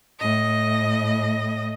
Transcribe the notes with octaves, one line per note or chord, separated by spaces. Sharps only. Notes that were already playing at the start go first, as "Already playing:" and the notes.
A2 D#5